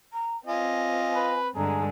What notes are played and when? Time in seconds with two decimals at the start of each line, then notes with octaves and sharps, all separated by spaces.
0.13 A#5
0.47 C4 F4 D#5 G#5
1.15 B4
1.55 G2 D3 G#3 G#4 A#5